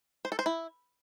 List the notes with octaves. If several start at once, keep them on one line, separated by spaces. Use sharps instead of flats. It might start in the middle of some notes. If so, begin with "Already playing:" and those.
C5
A4
C5
E4